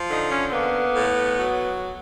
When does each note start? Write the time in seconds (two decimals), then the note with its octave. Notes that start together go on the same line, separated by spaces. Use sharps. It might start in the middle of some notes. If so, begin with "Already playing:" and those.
Already playing: F3
0.11 D3 D#4
0.31 C#4
0.47 C4
0.52 A#3 B3
0.94 A2
1.37 F#3